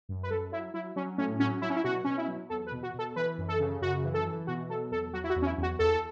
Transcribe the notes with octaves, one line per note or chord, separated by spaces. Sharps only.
F#2
B4
F#3 A4
F#3 E4
F#3 E4
F#3 C#4
A2 C#4
F#3 C#4
F#3 E4
C#4
E4
B2 F#4
B2 C#4
E4
F#3
E2 A4
B4
B2
F#4
B2 A4
E3 B4
F#2
A4
C#3
F#2 F#4
E3
A4
E3
B2 F#4
F#3 A4
E2 A4
F#3 F#4
E4
F#4
E2
C#4
E4
E2 F#4
E2 A4